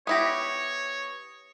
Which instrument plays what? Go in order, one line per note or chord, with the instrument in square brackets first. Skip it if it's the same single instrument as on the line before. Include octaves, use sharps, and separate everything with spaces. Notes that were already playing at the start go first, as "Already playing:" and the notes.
[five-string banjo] B3 E4 G4 [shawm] C#5 [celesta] D#6 A#6